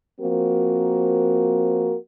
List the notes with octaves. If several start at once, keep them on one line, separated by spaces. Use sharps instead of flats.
F3 A#3 C4 F#4 A#4